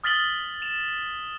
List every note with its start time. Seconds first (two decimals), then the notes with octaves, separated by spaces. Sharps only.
0.04 D#6 F6 A6 B6 F#7 G7
0.62 E7 F7